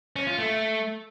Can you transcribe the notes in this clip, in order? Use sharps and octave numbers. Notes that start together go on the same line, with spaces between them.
C#4
F4
A3